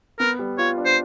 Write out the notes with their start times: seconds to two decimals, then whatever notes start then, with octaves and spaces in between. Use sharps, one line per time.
0.19 B3 A#4
0.39 G3
0.58 F4 C#5
0.78 D4
0.86 C5